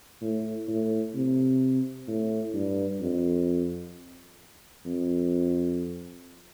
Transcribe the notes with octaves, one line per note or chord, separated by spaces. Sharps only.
A2
A2
C3
A2
G2
F2
F2